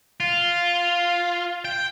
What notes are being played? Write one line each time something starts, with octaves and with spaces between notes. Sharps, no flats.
F4
G5